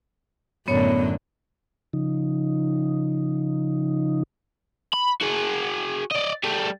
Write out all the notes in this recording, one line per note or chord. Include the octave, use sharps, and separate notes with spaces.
F#2 A2 D3 B3 C#5
C#3 F3 D#4
B5
F#4 G#4
D5 D#5
G3 A3